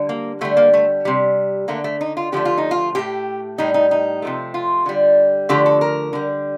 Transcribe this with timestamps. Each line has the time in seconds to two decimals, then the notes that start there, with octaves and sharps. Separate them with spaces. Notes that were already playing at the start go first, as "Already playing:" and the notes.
Already playing: D3 G3
0.09 A#3
0.41 D3 G3 A3
0.57 A#3
0.73 A3
1.05 C3 G3
1.68 D3 A3 A#3
1.84 A3
2.01 D#4
2.17 F4
2.32 D3 F3 A3 G4
2.45 F4
2.58 D#4
2.71 F4
2.95 A2 A3 G4
3.58 A2 G3 D#4
3.74 D#4
3.91 D#4
4.22 C3 F3 A3
4.54 F4
4.86 D3 G3
5.49 D3 F3 A3 G4
5.66 A4
5.81 A#4
6.13 D3 G3